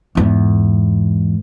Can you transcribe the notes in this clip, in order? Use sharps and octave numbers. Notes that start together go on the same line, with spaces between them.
E2 G#2